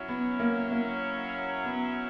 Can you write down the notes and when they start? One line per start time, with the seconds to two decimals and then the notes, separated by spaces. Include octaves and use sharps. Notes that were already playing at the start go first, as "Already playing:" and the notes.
Already playing: F#3 C#4 E4
0.08 B3
0.40 A#3
0.71 A#3
1.65 B3